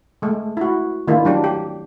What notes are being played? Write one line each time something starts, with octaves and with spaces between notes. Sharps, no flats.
G#3 A3
E4 F#4
D#3 A3 A#3 D4 E4 F4
F#3 D4 G4
G4